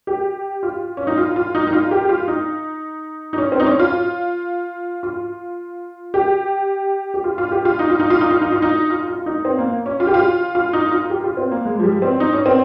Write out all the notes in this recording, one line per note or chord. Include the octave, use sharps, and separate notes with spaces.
G4
F4
C#4
D#4
F4
F4
D#4
D#4
F4
G4
F4
D#4
D#4
C#4
C4
D#4
C#4
F4
F4
G4
G4
F4
F4
G4
F4
D#4
F4
D#4
F4
D#4
F4
D#4
F4
D#4
F4
F4
D#4
C4
A#3
C#4
F4
G4
F4
F4
D#4
F4
G4
F4
C4
A#3
G#3
F3
G3
C4
D#4
C#4
C4